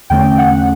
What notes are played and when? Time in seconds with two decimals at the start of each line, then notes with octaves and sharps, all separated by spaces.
0.10 E2 D3 A3 C#4 G5
0.38 F#5